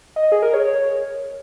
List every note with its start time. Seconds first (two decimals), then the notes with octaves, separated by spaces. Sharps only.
0.16 D#5
0.32 G#4
0.43 A#4
0.54 C#5